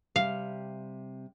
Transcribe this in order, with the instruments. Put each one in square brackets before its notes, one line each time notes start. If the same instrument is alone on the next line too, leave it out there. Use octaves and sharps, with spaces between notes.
[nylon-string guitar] C3 G3 [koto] F5